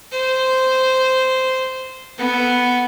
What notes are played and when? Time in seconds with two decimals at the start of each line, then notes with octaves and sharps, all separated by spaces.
0.12 C5
2.18 B3 A4